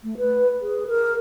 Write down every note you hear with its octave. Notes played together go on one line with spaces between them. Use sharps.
A3
B4
G#4
A#4